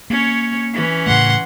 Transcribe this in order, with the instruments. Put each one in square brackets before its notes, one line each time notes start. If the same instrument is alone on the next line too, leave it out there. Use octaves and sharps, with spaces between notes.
[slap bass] A#3 [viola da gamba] C#4 C#5
[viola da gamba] E3 C#4
[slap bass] A2 C#3 A3 [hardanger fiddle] F#5 C6